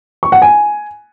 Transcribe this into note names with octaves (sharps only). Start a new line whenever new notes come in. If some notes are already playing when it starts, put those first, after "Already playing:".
C#6
F#5
G#5